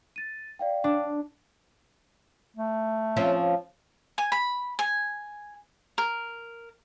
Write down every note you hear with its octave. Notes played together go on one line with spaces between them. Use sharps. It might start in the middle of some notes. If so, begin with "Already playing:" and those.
A6 D#7
D5 F5 G5
D4
A3
F3 C4 C#4
G#5
B5
G#5
A#4